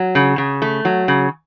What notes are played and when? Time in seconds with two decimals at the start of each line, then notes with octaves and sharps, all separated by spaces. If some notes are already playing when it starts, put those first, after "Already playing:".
Already playing: F#3
0.15 C#3
0.38 C#3
0.62 A3
0.85 F#3
1.08 C#3